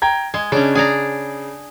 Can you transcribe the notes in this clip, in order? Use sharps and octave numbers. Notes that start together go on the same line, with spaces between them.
G5 A#5 G#6
G#3 G#6
C#3 C#4 D4
G#4 D5 A#5